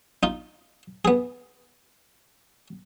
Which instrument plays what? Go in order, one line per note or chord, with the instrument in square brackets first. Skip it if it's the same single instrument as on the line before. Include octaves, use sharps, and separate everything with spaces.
[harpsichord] D#4 F4
B3 G#4